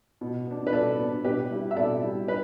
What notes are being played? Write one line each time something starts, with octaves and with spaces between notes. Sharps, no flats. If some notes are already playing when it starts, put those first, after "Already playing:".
B2
B3 D4
B4
B2 A4 D5
B3 D4
B2 G4 B4
G3 E4
E5
B2 A4 D5
G3 E4
B4